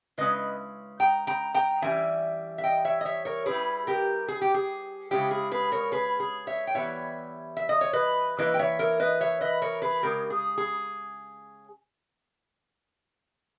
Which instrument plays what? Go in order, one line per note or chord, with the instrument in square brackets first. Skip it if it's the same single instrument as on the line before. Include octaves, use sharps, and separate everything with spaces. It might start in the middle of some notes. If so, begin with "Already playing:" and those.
[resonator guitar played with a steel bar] C#3 G#3 C#4 E4 B4 D#5
G5 A#5
G5 A#5
G5 A#5
E3 G3 C#4 E5 G#5
E5
D#5 G5
C#5 E5
D#5
C#5 E5
A#4 C#5
G3 C#4 E4 G#4 B4
G4 A#4
G#4
G4
G#4
C#3 G#3 C#4 E4 G4
G#4
G#4 B4
A#4 C#5
G#4 B4
G#4
C#5 E5
G5
E3 G3 B3 E4 C#5 E5
E5
D#5
C#5
B4 D#5
E3 A#3 E4 B4 D#5
G5
C#5 E5
A#4 C#5
B4 D#5
C#5 E5
B4 D#5
A#4 C#5
G#4 B4
C#3 G#3 C#4 G4 A#4
G#4
G#4